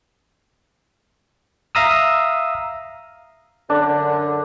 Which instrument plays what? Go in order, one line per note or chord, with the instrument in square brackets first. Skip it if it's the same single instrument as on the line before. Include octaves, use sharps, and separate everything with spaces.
[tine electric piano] E5 F5 A#5 D#6 E6
[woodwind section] F#2 D3 [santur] D4